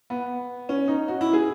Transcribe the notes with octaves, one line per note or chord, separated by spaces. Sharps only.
B3
C#4
D#4
F#4
E4
G#4